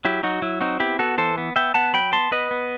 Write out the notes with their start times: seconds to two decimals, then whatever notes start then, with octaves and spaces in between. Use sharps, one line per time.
0.05 F#3 E4 G4
0.23 F#3 D#4 F#4
0.42 F#3 E4
0.61 C4 D#4 F#4
0.80 B3 E4 G4
0.99 B3 F#4 A4
1.18 E3 A4 C5
1.38 B3
1.56 B3 E5 G5
1.74 B3 F#5 A5
1.93 F#3 G5 B5
2.12 B3 A5 C6
2.31 B3 B4 D#5
2.51 B3